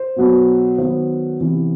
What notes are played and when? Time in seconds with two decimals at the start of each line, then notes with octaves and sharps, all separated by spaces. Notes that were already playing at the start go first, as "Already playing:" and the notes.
Already playing: C5
0.16 B2 F#3 B3
0.78 D#3 F#3 B3 C5
1.40 C3 E3 B3